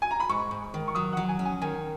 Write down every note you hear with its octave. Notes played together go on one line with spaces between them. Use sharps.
G#5
A#5
B5
G#2 C#6
G#2
D#3
C#6
F#3 D#6
F#5
F#3
G#5
C#4
G#5
D#3 G#5